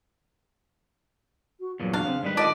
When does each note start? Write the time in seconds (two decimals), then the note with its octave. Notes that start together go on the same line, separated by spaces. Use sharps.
1.60 F#4
1.80 E2 G2 A#2 F#3
1.93 D4 F5
2.06 C#3 C4
2.23 G#2 D#3 G3 B4
2.37 D3 F4 D5 D#5 A5